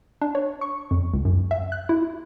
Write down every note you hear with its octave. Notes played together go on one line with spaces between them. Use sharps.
D4
C#5
C#6
F2
C#2
F#2
E5
F#6
E4